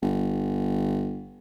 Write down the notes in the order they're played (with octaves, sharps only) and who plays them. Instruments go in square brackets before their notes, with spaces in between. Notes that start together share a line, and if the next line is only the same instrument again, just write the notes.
[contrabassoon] G1